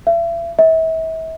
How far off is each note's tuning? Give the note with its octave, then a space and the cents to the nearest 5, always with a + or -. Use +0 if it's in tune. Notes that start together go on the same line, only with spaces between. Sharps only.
E5 +40
E5 -35